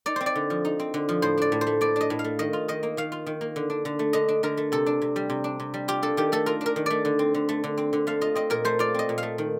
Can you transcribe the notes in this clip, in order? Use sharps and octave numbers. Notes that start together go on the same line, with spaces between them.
D#4 D5
C4 C5
D5
D3
F3
D#4
C4
D3
F3
A2 C5
D4 D5
A2
C5
A3
A2 D5
D4 D#5
A2
F5
A3
D#3 D#5
F4
D#3 D#5
A#3
D#3 F5
F4
D#3
A#3
D3
D4
D3
A3
D3 D#5
D4
D3 A#4
A3
C3 A4
D4
C3
G3
C3
D4
C3
G3
F4 G4
D4 A4
D#3 G4
A3 A4
F4 A#4
D4
A#4
D#3
A3 D5
D3
C4
D3
A3
D3
C4
D3
A3 F5
F4 D#5
C4 D#5
A#2 A#4
A3 C5
F4 D5
C4 D#5
A#2
A3 F5
D#3